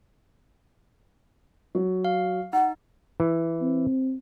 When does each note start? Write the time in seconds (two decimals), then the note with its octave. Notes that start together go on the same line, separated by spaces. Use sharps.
1.75 F#3
2.05 F5
2.53 D#4 F#5
3.20 E3
3.62 C4